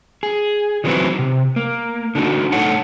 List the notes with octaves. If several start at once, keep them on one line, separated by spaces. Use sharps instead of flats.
G#4
D#3 E3 F#3 C4 E4 B4
C3
A#3
D3 D4 D#4 F#4
A2 D#4 A4 C#5 F#5 A5